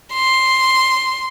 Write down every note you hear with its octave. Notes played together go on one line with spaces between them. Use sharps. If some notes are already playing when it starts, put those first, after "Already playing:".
C6